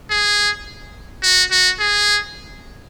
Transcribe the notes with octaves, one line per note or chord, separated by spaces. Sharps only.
G#4
F#4
F#4
G#4